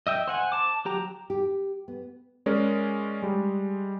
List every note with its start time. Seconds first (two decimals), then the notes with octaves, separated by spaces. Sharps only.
0.07 D#5 E5 G5
0.27 C5 F#5 G#5
0.52 A5 D6
0.85 F#3 G4 A#5
1.30 G4
1.88 B3
2.46 G#3 C#4 A#4 D5
3.23 G3 G#3